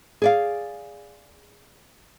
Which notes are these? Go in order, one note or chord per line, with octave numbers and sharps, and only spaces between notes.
G#4 D5 F5